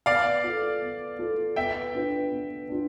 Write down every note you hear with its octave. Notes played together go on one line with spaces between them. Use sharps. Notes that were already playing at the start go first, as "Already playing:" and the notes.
B3 D5 F5
F4 A4
B3
F4 A4
B3 E5 G5
D4 F4 B4
B3
D4 F4